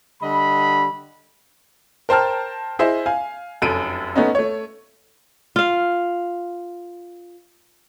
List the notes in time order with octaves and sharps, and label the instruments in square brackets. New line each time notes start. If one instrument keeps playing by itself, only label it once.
[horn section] D3 G3 D#5 B5
[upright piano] A#4 C5 G5 A5 F6
E4 G#4 C5 D#5 E5
F5 G#5
F1 F#2 A4 D7 D#7
A3 B3 C#4 D#4
A3 C#5
[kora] F4 F5